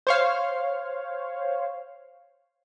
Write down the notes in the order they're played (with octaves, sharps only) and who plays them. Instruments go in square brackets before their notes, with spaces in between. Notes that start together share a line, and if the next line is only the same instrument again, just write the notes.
[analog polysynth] C5 C#5 F5